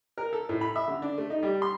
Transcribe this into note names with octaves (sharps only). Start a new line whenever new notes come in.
A#4
A4
A2
B5
E5
D3
D4
A3
D#4
G3
C6